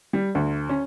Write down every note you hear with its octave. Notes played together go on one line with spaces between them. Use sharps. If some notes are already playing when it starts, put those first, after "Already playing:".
G3
D2
C#4